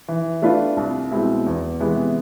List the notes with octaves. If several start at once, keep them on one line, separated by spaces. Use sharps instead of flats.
E3
A3 D4 F4 B4
C2
B2 G#3 C4 E4
E2
C3 E3 G#3 B3